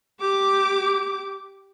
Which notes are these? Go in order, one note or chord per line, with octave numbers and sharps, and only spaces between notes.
G4 D6